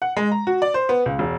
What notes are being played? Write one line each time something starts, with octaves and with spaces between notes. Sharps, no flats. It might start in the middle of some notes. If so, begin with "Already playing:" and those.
F#5
G#3
A#5
F#4
D5
C5
B3
C#2
E1